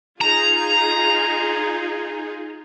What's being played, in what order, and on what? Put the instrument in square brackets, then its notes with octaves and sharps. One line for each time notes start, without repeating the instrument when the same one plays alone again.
[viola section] D#4 F4 G#4 [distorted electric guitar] A#5